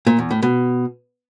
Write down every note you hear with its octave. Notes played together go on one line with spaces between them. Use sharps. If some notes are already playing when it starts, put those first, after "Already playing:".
A#2
E2
A2
B2